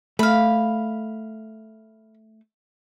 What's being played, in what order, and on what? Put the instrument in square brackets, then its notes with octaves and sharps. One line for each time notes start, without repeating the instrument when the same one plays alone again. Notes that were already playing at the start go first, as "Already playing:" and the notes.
[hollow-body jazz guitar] A3 [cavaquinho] F5 B5